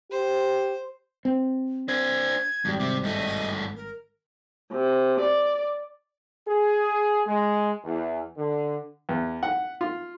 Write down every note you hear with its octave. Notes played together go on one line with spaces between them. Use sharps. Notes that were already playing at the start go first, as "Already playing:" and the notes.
G4 C5
C4
D4 C5 G#6
G#1 F2 G3
C3 C4 D6
G2 A3 D#5
A#4
C3
D5
G#4
G#3
E2
D3
E2
F#5
F4